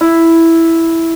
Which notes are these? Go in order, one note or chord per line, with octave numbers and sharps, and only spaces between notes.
E4